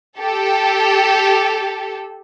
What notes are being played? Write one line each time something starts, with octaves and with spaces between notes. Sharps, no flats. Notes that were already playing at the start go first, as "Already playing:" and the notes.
G4 A4